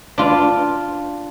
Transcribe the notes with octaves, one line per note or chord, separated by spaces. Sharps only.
D4 F4